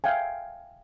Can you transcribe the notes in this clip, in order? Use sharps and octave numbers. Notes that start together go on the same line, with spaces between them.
E5 F5 G5 G#5